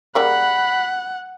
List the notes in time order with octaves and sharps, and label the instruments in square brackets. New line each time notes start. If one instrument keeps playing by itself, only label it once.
[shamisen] C#3 G3 A#3 [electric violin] F#5 [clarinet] B5